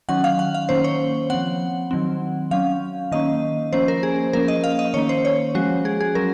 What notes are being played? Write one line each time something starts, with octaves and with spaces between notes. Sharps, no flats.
D#3 F#3 C#4 F#5
F5
F#5
F5
D#3 A#3 C#4 C5
C#5
F3 C4 F#5
D#3 F#3 C4
F#3 C#4 F5
D#3 A#3 C#4 D#5
F3 A#3 C#4 C5
A#4
G#4
F3 A#3 C#4 A#4
D#5
F5
D#5
D#3 A#3 C#4 C#5
C5
C#5
F3 G#3 C#4 F#4
G#4
G#4
F#3 C#4 A#4